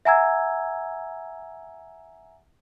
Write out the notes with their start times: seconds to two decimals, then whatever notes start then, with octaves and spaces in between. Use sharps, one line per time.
0.05 E5 F#5 G#5 A#5 E6 G#6